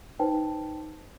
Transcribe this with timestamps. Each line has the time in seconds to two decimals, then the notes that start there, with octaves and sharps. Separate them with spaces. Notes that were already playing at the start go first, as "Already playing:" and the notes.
0.19 D#4 B4 C5 G5 A5